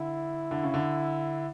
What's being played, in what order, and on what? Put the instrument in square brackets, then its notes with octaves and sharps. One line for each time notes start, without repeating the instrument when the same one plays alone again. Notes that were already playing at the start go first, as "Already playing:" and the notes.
Already playing: [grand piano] D3 [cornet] E4
[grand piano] D3
C#3
D3